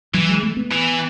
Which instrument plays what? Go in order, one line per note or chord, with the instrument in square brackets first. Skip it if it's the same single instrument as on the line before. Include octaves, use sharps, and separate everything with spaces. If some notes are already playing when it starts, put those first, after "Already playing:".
[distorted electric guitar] E3 [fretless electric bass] F#3
[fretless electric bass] G#3
A3
B3
[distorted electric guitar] E3